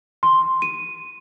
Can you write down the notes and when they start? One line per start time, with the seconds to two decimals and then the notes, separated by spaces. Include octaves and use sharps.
0.23 C6
0.62 D#7